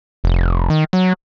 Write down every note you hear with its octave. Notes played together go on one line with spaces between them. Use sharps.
F1
D#3
F#3